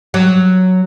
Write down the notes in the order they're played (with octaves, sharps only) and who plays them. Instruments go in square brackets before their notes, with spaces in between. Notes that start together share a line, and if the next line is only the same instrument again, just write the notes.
[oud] F#3